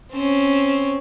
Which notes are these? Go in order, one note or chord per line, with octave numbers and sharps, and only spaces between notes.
C4 C#4